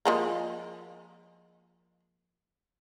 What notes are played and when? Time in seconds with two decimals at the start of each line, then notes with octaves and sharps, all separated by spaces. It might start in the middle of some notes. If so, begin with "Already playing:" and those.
0.05 F3 G#3 A#3